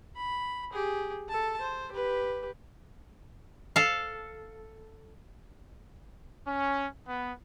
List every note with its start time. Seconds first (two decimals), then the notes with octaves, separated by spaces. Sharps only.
0.16 B5
0.73 G4 G#4
1.29 A4 A5
1.61 C5
1.92 G4 B4
3.76 A4 F5
6.47 C#4
7.05 B3